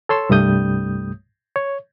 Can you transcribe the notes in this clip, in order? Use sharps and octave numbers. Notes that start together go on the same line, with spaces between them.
A4 C#5 C6 E6
C2 G2 G3 A3 D#6 G6
C#5